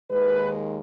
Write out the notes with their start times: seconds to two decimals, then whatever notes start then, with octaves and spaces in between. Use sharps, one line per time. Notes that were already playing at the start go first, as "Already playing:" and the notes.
0.09 D#2 D#3 G#3 B4